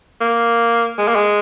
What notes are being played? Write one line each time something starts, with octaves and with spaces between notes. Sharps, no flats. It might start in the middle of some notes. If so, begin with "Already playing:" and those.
A#3
G#3
A#3
G#3